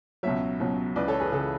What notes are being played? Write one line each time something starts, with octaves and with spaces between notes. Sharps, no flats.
C#2 B2 F#3 C#5 E5
C#2 B2 F#3
C#2 C#3 E3 B4 D5
A4 C#5
G#4 B4
C#2 C#3 E3 A4